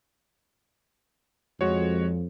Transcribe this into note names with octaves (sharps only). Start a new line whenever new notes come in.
F2 G#3 F#4 C#5